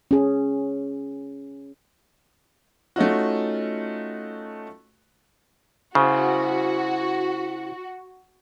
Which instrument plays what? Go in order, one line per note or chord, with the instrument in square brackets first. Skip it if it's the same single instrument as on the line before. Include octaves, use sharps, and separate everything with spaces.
[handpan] C#4 G#4
[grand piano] A3 C#4 D#4 F4 F#4
[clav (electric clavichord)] C#3 [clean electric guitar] E4 C5 [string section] F#4